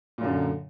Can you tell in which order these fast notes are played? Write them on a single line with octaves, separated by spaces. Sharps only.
A#2 F#2 D3